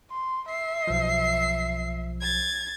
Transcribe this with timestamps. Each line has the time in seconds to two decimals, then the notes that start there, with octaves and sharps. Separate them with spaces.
0.11 C6
0.50 E5 C7
0.87 B1 F3
2.22 G#6 A6